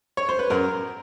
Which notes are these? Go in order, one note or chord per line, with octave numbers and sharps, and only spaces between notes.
C#5
C5
B4
F#2 A#4